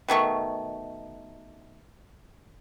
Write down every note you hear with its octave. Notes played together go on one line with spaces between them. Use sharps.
B2 D#3 A3 C#6